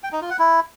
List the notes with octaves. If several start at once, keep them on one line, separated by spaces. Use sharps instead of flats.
G5
D#4
F4
F#5
E4